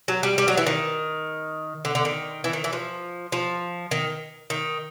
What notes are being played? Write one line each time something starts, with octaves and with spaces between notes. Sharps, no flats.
F#3
G3
G3
F#3
E3
D#3
D3
D3
D#3
E3
D#3
E3
F3
F3
D#3
D#3